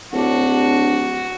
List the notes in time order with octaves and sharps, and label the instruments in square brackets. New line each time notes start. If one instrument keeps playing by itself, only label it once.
[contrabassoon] D1 [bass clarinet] D4 [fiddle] F#4